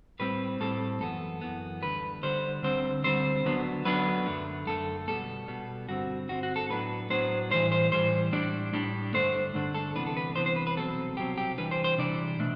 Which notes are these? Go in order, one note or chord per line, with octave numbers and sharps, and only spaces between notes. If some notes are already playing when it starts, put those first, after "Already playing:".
A2 G3 C4 B4
A2 G3 C4 A4
F#2 E3 B3 A4
F#2 E3 B3
D2 D3 G3 B4
D2 D3 G3 C5
D2 D3 G3 C4 C5
D2 D3 G3 C4 C5
D2 D3 F#3 B3 D4
D2 D3 F#3 B3 D4 B4
F#2 D3 A3
F#2 D3 A3 A4
B2 G3 B3 A4
B2 G3 B3
G2 D3 G3 C4 F#4
G2 D3 G3 C4 F#4
F#4
A4
A2 F#3 B3 D4 B4
A2 F#3 B3 D4 C5
A2 E3 G3 C5
C5
A2 E3 G3 C5
A2 G3 D4 D5
A2 G3 D4
G2 D3 A3 D4 C5
G2 D3 A3 D4
A4
C2 C3 E3 B3 D4 B4
A4
B4
C2 C3 E3 B3 D4 C5
C5
B4
B4
C2 B2 F#3 C4 A4
C2 B2 F#3 C4 G4
G4
C3 E3 G3 D4 B4
C5
C5
C3 E3 G3 D4 D5
B2 A3 D4